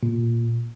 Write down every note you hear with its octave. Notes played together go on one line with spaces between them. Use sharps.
A#2